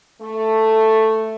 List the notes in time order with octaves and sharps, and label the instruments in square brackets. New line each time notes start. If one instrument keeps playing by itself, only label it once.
[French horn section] A3